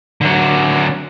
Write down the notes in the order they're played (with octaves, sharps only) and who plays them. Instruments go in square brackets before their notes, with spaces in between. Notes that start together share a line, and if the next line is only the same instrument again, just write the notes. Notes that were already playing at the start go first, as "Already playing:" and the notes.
[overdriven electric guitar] D3 F#3